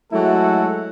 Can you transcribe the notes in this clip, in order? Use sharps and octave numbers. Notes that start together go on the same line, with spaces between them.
F#3 G#3 A3 E4 F#4 A4